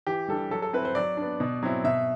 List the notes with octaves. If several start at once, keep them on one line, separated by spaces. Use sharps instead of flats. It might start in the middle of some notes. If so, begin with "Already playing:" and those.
E3 G4
G3 D4 A4
F#3 A4
A4
C4 E4 B4
C5
F#3 D5
B3 D4
B2
F#3 C4 E4
B2 E5